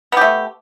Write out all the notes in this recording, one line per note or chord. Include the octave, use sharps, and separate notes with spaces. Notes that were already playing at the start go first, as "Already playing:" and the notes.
A3 B3 G4